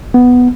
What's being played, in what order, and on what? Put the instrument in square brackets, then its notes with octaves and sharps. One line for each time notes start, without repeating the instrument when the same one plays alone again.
[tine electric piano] B3